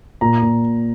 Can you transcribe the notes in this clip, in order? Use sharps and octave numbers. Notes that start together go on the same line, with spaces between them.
A#2 A#5
A#2